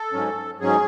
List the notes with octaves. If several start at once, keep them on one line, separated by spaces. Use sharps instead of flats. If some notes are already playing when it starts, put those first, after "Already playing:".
Already playing: A4
G#2 F#3 C#4
G#2 F#3 C#4 G#4